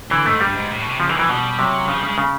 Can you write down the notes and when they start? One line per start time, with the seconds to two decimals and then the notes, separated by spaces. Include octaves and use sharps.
0.11 D3 E3
0.26 G#2 A3
0.41 G2 G3
0.56 G#2
0.71 A2
0.80 B2
0.89 C3
1.00 C#3 F3
1.09 D#3 E3
1.19 E3 F3
1.29 B2 G3
1.58 C3 F#3
1.88 C#3 F3
1.98 G3
2.03 C#3
2.08 G#3
2.18 C#3